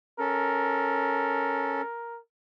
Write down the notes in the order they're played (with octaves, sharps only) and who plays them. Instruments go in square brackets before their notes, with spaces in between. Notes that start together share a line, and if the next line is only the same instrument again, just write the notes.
[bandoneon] C#4 A4 [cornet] A#4